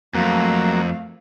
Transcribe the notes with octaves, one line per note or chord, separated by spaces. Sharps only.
F2 F#3 A3 A#3 F5